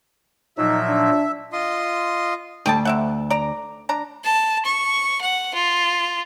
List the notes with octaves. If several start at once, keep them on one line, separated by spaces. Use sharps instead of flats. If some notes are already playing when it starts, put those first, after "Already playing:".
A#2 F3 F#3 D#4 E5
D4
F4 D#5 C6
D2 G4 G5 A5
C3 E5 F#5
D5 A#5
D4 A#5
A5
C#6
F#5
F4